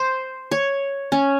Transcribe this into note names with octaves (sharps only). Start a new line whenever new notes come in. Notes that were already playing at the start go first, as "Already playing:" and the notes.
Already playing: C5
C#5
C#4